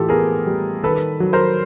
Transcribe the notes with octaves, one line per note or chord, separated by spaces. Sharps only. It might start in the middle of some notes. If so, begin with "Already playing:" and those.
Already playing: A2 E3 F4 G4 A4
B3 G#4 A#4
G3
D#3 A4 B4
F#3
A#4 C5